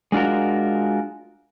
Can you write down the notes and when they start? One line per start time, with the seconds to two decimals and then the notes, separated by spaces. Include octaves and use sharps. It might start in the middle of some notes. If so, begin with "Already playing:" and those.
0.12 G#3 D4 F4 F#4 A#4